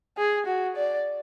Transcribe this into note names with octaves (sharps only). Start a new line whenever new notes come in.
G#4
F#4
D5